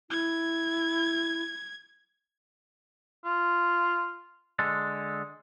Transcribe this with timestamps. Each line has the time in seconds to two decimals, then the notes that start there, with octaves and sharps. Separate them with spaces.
0.10 E4 G#6
3.25 F4
4.59 D3 G#3 A4